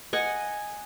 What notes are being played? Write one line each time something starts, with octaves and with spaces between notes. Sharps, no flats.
D#5 F#5 G#5